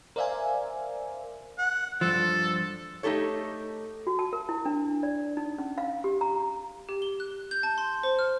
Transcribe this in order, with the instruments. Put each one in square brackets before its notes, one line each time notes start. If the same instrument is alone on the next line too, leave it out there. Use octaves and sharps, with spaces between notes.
[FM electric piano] A#4 C5 D5 E5 F5 G#5
[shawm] F#5
[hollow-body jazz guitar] G2 F3 [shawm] A4
[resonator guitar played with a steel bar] A3 D#4 G4 A4 C#5
[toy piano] F#4
A5
A#4
E4
D4
D5
D#4
C#4
F5
G4
A#5
[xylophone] G4
G7
F#6
G6
A5
C6
C5
F6